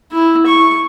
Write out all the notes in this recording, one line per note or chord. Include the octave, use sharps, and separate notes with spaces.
E4
C#6